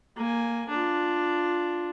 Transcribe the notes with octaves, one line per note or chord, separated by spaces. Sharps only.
A#3 G#5
D4 F4